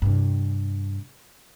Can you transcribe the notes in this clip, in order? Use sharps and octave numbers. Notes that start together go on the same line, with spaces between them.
G2 C3